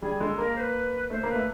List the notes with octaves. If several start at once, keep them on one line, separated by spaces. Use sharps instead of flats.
G3 G#4
G#3 A4
A#3 A#4
C5
B4
A3 C5
A#3
B4
A3